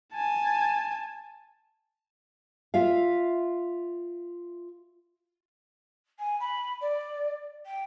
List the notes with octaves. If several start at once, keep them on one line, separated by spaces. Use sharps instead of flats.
G#5 A5
F4 E5 F5
G#5
B5
D5
G5